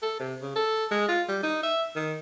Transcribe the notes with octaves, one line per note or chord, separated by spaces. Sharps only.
A4
C3
C#3
A4
G#3
F4
G3
D#4
E5
D#3